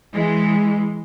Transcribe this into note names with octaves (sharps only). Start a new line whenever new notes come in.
E3 G#3